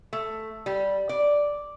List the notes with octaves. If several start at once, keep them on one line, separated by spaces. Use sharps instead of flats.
A3
G3
D5